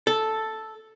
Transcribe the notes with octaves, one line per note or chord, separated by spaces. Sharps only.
A4